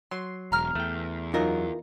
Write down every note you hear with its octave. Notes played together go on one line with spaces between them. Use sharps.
F#3 C6
E1 A#5 F6
E2 A3 G5
F#2 F#3 D#4 F4 A#4